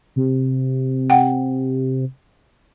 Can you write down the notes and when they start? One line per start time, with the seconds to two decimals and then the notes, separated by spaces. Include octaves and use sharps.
0.16 C3
1.10 F#5 G5